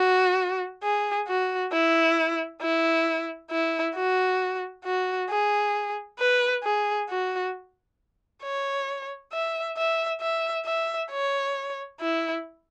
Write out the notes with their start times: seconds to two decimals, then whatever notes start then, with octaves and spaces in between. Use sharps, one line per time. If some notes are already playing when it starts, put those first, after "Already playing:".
Already playing: F#4
0.83 G#4
1.27 F#4
1.72 E4
2.62 E4
3.51 E4
3.95 F#4
4.85 F#4
5.29 G#4
6.19 B4
6.63 G#4
7.09 F#4
8.43 C#5
9.32 E5
9.77 E5
10.21 E5
10.65 E5
11.11 C#5
12.00 E4